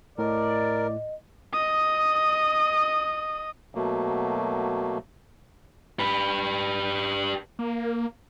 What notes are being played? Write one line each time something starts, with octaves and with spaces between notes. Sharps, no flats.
A2 A#4 D5 D#5
D#5 D#6
B2 F#3 A3 A#3
G4 B4
A#3